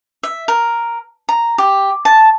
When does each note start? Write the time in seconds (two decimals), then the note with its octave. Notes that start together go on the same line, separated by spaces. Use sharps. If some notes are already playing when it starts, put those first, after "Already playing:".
0.23 E5
0.48 A#4
1.29 A#5
1.58 G4
2.05 A5